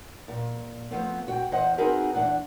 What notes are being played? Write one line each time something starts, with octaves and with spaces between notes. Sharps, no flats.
A#2
F3 A3 B3 C4
F#4 G5
E2 C5 D#5 F#5
C4 D#4 F#4 G#4 A#4 B4
E2 D4 F#5